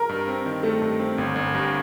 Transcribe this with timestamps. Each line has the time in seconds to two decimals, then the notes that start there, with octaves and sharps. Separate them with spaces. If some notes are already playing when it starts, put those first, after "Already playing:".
Already playing: A#4
0.09 G2
0.28 C4
0.46 D#3
0.63 A3 A4
0.82 G2
1.00 C4
1.18 G1
1.36 G1
1.54 G2